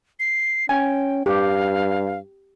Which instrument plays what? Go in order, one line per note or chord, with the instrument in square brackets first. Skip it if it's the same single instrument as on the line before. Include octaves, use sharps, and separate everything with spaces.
[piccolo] C7
[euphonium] C#4 [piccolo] G5 [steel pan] G#5
[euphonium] G2 [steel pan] G4 [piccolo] F5